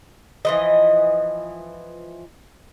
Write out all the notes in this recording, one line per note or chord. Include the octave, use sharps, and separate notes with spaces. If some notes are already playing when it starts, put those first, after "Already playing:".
E3 F3 D#5